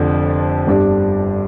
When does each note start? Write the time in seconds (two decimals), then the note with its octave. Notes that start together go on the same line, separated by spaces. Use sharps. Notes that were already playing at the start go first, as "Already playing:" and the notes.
Already playing: F1 F2 D3 F3 D4
0.67 G1 G2 G3 D4